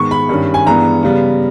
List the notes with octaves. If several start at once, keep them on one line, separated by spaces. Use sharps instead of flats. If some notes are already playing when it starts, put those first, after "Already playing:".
Already playing: G#2 D#3 G#3 B3 C#6
B5
G2 D#3 G3 C#4
G#5
G2 E3 G#3 B3 A#5
C#3 G3 B3